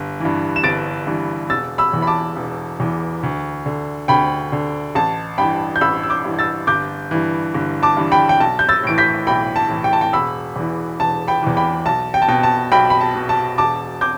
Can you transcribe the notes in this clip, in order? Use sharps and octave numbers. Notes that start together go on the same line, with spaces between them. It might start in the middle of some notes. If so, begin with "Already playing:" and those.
Already playing: G1
G2 E3
E7
G1 A6 D7
G2 E3
E1 E6 A6
B5 E6
E2 E3
B5
A5 D6
E1
E2 E3
D2
D3
D2 G5 B5
D3
A1 A5
G2 E3 G5 B5
G6
A1 B5 E6
E6
D6 G6
G2 E3
E6 A6
G1 D6 G6
G2 E3
G1
A5 D6
G2 E3
G5 B5
G5
B1 A5
G6
E6 A6
A2 E3 D7
G6 B6
B1 G5 B5
A5
A2 E3
G5
A5
G5
E1 B5 E6
E2 E3
E1 A5
G5 B5
E2 E3
G5 B5
B1 A5
G5
A5
B2 G5
A5
B1 G5 B5
B5
A5
B2
A5
E1 A5 D6
D6 G6